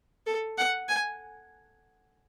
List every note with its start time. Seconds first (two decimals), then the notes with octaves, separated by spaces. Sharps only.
0.26 A4
0.58 F#5
0.88 G#5